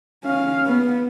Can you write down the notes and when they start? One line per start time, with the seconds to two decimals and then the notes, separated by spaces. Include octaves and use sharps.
0.24 C#4 F5
0.66 B3